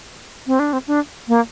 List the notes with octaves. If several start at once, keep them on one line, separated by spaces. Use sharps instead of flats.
C4
D4
C4
D4
A#3